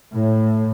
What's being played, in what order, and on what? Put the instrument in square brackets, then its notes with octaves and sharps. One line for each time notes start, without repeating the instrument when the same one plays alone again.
[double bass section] A2